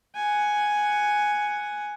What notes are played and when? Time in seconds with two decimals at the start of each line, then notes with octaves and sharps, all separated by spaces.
0.15 F#5 G#5